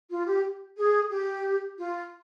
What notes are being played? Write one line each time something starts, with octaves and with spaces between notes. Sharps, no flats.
F4
G4
G#4
G4
F4